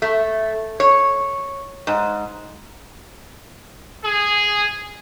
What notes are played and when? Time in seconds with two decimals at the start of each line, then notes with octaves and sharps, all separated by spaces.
0.02 A3
0.80 C#5
1.87 G#2
4.04 G#4